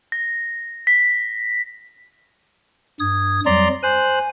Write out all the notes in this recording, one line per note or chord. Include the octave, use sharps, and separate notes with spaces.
A#6
B6
G2 D#6 G#6
F2 F#3 G3 D5 A#5 C6
C5 G#5 F#6